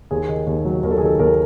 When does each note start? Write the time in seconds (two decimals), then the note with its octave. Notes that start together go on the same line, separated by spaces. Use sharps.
0.11 D#2 G#4
0.28 D#3
0.47 D#2
0.65 F#3
0.83 D#2 A#4
0.91 A4
0.98 G#4
1.02 D#3 A4
1.19 D#2 A#4